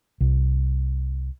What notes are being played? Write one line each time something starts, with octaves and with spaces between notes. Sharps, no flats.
C2